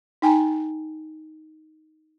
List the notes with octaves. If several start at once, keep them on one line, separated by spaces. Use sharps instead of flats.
D#4 G5 G#5 A#5